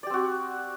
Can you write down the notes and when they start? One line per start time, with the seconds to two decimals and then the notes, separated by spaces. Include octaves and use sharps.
0.03 D5
0.07 G4
0.10 C4
0.14 F#4